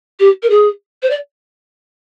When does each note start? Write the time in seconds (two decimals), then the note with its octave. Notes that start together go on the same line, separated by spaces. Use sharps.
0.20 G4
0.43 A#4
0.50 G#4
1.03 C5
1.10 D5